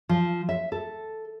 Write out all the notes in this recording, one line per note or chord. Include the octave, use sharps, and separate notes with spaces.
F3
E5
A4